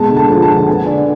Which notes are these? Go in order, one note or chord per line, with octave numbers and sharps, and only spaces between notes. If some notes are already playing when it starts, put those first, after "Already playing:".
Already playing: B2 G#3 A5
D3
A5
F3
A5
D3
B3 G#5
D3 D5